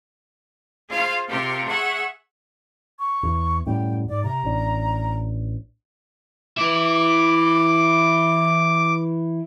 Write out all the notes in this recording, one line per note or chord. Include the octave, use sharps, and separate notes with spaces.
F4 G#4 C5 F5
C3 F4 G4 A#4
G#4 E5 F#5 C#6
C#6
E2
F#2 A2 G3 G5
G#2 D5
C3 A#5
A1 D4
E3 E4 D6